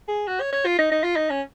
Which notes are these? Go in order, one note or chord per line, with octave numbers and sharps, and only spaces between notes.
G#4
F#4
C#5
C#5
F4
D#4
D#4
F4
D#4
C#4